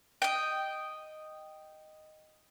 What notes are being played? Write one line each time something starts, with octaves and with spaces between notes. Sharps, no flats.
D#5 G5